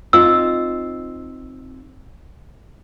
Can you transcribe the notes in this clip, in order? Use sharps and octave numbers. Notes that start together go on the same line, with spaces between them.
C4 D#4 F4 E6